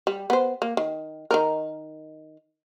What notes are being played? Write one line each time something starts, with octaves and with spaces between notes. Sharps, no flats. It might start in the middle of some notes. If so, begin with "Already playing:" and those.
G3
B3 C5
A#3
D#3
D#3 D#4 A#4